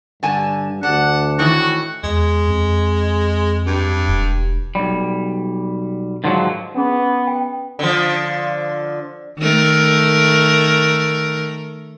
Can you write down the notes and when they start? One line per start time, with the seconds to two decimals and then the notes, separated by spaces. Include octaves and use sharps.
0.23 G2 D3 G#5 A5
0.83 D2 D4 F#5
1.39 A2 D#3 E3 F#4
2.03 E2 G#3
2.48 F2
3.66 G2
4.08 E1
4.75 B1 G#2 G3
6.24 G#2 D3 D#3 F3 F#3
6.75 B3 C#4 D4 G#4
7.27 G5
7.79 D3 F3
9.39 D#3 A3 A#4